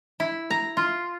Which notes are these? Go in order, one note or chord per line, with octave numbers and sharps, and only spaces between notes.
E4
A#5
F4